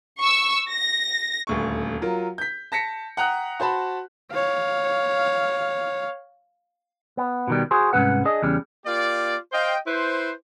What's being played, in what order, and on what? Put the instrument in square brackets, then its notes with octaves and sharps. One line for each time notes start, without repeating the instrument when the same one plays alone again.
[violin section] C#6 E6
A#6
[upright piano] D#1 D2 C#6
F#3 F4 A#4
G6 B6
A5 A#6 B6 C#7
F#5 G5 A#5 D#6 F#6
F#4 C5 A5 B5
[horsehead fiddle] C#5 F5
[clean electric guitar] B3
B2 D#3 G3
F#4 G#4 C5
C2 G#2 F3 C#4 B4 F#5
D4 G#4 D#5
E2 C#3 G3
[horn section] A#3 F4 G4 D5
C5 D#5 F5 G5
E4 B4 C5